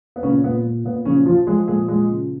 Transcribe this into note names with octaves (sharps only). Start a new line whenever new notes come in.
B3
A#2 C#3 C#4
A#2 B3
A#2
A#2 B3
C#3 F3 C#4
F3 F4
F3 G#3 G#4
A#2 G#3 G#4
F3 G#3 G#4
C#3